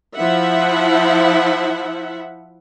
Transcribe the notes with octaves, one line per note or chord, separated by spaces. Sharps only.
F3 E4 E5 F#5